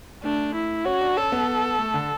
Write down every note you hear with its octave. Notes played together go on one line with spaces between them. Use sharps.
A3 D4
E4
C#4 F#4
D4
C#4 A4
B3
A3
D3